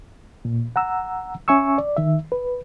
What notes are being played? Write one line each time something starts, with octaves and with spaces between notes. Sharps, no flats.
A#2
F#5 A#5 E6
C#4 E5 G#5 C#6 E6
D5
D#3 E5
B4